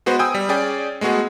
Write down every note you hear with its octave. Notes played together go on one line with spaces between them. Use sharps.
G#3 B3 F#4 B4 C5
G5 G#5 D#6 E6
G3
C#4 G#4 D5 G5
G#3 A3 B3 F#4 G#4